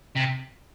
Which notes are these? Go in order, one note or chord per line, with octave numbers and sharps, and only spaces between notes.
C3